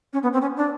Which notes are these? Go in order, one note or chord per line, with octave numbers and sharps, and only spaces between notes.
C#4
B3
C4
C#4
D4